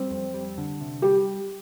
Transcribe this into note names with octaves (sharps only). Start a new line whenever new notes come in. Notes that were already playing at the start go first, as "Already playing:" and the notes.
Already playing: G3 C4
F2
G3
D3
C3
G3 G4